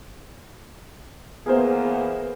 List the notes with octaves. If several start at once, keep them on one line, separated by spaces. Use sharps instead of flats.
E2 A#3 B3 G#4 A#4 C5